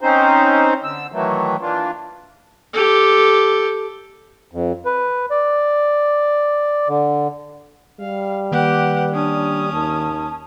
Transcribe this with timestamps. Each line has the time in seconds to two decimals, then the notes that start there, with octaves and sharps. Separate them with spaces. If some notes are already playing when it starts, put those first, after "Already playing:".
0.01 C4 C#4 D#4 C5
0.84 D3 E6
1.12 D#3 E3 F#3 A3
1.61 E3 A#3 D4 F4
2.73 G4 A4
4.52 F2
4.86 B4
5.31 D5
6.89 D3
8.00 G3 F5
8.52 D#3 A#3 G4 B4 F#5
9.14 C#4 D4 D#6
9.73 D#2 A5